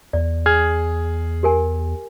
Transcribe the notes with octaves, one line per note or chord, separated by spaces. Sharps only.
E2 D5
G#4 F6 G#6
G4 A#4 G#5